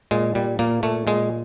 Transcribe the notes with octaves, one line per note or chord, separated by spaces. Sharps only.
A#2 G#3
A#2 G3
A#2 A#3
A#2 A3
A#2 G#3